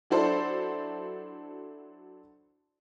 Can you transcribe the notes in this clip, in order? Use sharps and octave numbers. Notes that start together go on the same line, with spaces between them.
F#3 D4 E4 A4 C5